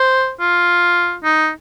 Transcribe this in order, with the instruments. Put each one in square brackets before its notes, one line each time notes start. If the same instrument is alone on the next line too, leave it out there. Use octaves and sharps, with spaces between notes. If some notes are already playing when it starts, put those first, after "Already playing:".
Already playing: [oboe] C5
F4
D#4